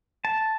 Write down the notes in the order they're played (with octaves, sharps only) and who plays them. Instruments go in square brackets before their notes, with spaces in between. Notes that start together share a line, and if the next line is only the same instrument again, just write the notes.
[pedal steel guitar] A5